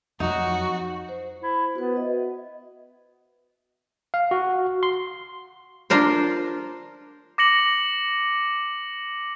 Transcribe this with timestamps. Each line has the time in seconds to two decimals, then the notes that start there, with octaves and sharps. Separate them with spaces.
0.20 F2 F#3 D#4 F#4
1.09 C5
1.43 E4
1.76 B3 F#4 B4
1.97 D#5 E5
4.14 F5
4.31 F#4
4.83 C6
5.90 D4 F4 A#4 C5
7.38 D6 A#6 C#7 F#7